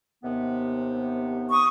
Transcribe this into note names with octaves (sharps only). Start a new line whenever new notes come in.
D#2 C3 B3
C#6 D#6